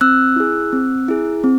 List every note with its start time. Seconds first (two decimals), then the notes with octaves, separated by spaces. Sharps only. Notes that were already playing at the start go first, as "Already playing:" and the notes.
0.01 C4 E6 F#6
0.36 E4 G#4
0.73 C4
1.08 E4 G#4
1.44 C4